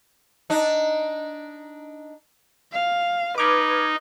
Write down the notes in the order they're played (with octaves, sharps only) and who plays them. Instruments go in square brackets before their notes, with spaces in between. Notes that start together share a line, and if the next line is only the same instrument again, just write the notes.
[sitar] D4 D#4
[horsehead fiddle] F5
[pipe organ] D#4 [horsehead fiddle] B4 [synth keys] D6 F6 G#6